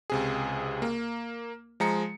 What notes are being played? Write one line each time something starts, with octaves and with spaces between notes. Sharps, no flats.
C#2 C3 G#4
A#3
F3 G#3 A#5 C#7